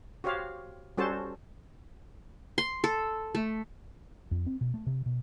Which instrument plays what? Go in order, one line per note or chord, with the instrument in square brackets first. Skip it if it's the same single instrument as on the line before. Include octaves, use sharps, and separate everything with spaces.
[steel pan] F#4 G4 C5 C#5 F5
G3 C#4 F#4 A4 C5 A5
[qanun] C6
A4
A3
[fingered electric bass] F2
C4
B2
A3
C3
B2